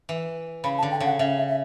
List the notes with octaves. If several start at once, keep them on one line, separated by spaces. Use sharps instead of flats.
E3
C#3 B5
A5
D3
G5
C#3 F#5
C#3 E5
E5
E5